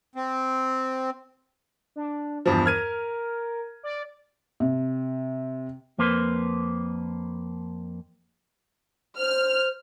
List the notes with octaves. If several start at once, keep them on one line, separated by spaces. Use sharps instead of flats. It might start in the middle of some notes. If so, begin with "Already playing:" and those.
C4
D4
E2 G2 F3
A#4 F6 G#6 D#7
D5
C3
F2 A#3 B4 C5
C5 F6